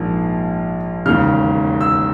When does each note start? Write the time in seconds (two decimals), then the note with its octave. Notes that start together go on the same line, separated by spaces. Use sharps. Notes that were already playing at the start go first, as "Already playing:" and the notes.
Already playing: A#1 G#2 F3 A#3
1.06 E1 D#2 C#3 F6
1.81 E6